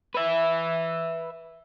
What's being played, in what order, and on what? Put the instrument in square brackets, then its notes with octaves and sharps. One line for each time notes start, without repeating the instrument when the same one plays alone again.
[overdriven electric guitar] B4 E5